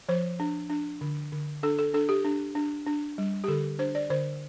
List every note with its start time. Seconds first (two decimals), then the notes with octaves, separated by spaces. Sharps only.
0.09 F3 C5
0.40 D4
0.70 D4
1.01 D3
1.33 D3
1.63 D4 A4
1.79 A4
1.94 D4 A4
2.09 G4
2.25 D4
2.55 D4
2.87 D4
3.18 G3
3.44 G4
3.48 D3 A4
3.79 D4 C5
3.95 D5
4.10 D3 C5